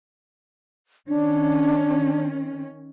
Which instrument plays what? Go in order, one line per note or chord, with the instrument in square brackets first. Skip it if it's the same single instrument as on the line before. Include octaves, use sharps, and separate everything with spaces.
[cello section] D#3 C#4 [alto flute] D4